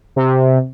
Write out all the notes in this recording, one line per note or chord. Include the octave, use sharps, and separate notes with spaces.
C3